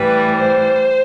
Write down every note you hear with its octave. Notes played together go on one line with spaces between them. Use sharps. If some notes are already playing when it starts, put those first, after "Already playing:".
Already playing: A2 E3 G3 B4
C5